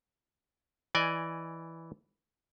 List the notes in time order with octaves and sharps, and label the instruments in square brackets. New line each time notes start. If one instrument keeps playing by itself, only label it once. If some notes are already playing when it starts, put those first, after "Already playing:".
[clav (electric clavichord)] E3 D5 D#5 G#5